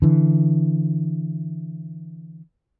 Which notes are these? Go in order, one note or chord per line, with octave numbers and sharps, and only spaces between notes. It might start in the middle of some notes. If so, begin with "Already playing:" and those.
D3 E3